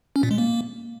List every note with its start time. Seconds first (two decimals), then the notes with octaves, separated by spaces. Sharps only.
0.16 C#4
0.23 A#2
0.31 G#3
0.38 A#3